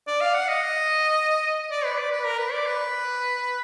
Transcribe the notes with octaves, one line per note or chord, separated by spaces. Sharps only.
D5
F5
F#5
D#5
D5
B4
D5
B4
A#4
B4
D5
B4